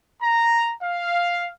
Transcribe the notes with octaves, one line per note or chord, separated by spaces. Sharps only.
A#5
F5